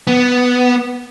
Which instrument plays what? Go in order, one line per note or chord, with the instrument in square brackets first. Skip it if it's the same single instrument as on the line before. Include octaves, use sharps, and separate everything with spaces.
[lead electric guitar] B3